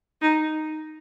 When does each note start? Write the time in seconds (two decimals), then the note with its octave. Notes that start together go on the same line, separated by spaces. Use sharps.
0.22 D#4